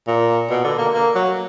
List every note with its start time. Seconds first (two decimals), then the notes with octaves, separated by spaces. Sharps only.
0.07 A#2
0.50 B2
0.64 D3
0.79 A#3
0.94 A#3
1.15 F#3